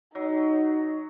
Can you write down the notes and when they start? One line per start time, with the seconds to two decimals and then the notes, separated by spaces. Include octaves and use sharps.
0.15 F#3 D#4